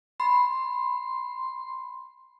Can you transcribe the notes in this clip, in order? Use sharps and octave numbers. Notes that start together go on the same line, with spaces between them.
B5 C6